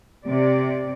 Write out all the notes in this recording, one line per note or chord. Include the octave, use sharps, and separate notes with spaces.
C3 D5